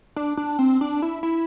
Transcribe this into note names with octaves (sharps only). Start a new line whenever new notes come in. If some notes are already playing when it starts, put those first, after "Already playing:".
D4
D4
C4
D4
E4
E4